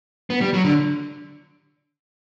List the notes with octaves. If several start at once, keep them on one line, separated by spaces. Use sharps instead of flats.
B3
G3
F#3
D3